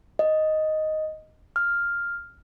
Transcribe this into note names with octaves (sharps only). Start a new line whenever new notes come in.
D#5
F6